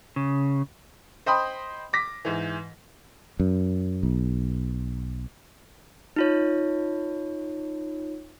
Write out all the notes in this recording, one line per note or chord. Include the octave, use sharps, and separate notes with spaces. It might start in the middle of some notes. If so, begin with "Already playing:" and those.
C#3
C5 D#5 G5 B5 C6 D#6
D6 A#6 B6
G#2 E3
F#2
B1
D#4 F4 C#5